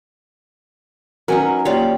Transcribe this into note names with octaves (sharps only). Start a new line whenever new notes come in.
F#3 C#4 D#4 A#4 B4 G#5
D#2 F4 G4 C#5 D5 F5